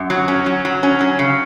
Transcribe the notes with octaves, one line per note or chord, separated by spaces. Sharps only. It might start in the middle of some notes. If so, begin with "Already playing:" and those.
Already playing: F#2
F#3
C#4
F#3
F#3
C#4
F#3
C#3